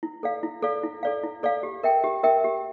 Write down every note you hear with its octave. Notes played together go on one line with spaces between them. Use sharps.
E4
A4 D5 F5
E4
A4 D5 F5
E4
A4 D5 F5
E4
A4 D5 F5
G4
A#4 E5 G5
G4
A#4 E5 G5
G4